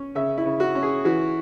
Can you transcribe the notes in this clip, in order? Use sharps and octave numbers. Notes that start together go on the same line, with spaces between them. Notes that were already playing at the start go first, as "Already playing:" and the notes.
Already playing: C#4
C#3 E5
E4
C#3
F#4
C#4
G#4
E3 F#4